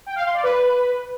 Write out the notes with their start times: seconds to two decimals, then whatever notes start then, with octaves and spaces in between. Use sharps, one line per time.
0.06 G5
0.16 F5
0.25 C6
0.34 D5
0.44 B4